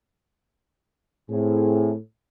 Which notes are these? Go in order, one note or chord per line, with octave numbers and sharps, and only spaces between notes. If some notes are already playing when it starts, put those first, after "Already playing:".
A2 C4 G#4